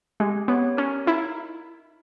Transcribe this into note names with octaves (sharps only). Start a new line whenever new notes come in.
G#3 G4
B3 C#5
C#4 A#4
D#4 E4